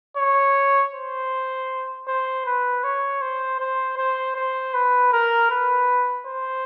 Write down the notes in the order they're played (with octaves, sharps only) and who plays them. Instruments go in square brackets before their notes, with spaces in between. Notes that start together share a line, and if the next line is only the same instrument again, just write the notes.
[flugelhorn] C#5
C5
C5
B4
C#5
C5
C5
C5
C5
B4
A#4
B4
C5